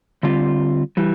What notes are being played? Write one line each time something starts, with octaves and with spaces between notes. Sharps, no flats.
D3 G3 C4 F4
E3 G3